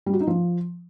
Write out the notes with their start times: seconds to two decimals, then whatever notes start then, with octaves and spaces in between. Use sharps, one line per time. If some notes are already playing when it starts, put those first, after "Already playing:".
0.06 G3
0.13 F#4
0.20 D#4
0.27 F3